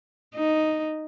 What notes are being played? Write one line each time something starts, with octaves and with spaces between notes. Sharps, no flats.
D#4